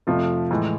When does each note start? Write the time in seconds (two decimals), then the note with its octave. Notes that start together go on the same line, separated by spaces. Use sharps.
0.07 F2 C3 F3 A3
0.51 A2 E3 G#3